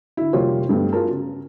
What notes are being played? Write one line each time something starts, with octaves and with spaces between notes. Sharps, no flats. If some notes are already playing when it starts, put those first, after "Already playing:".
D3 E4
F1 G3 A#3 F4 C5 C#5
G2 G3 A3 B3
F4 F#4 G#4 A#4 A5
C#3